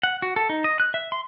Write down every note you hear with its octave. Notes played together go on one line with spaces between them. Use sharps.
F#5
F#4
A4
D#4
D#5
F#6
E5
C6